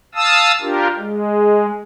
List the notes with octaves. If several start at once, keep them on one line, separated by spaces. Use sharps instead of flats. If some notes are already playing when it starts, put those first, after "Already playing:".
F5 A5 D#6 E6
D4 F4 G4 A#4
G#3